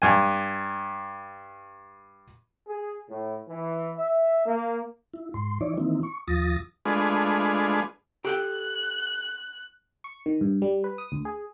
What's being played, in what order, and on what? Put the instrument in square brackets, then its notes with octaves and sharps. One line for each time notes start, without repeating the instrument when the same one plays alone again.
[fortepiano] G2 G#5
[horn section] G#4
A2
E3
E5
A#3
[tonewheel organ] E4
G#2 C6
E3 D#4 E4 C#5 D5
D#3 E3 A#3 C4 D#4 E4
C#6
D#2 F3 F4 D#6 A6 A#6
[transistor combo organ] G#3 A3 D4 F4 G#4 B4
[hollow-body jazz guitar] G4 A4 G5 [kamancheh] F#6
[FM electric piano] C#6
D#3
G2
G3
B4
D#6
D2
G#4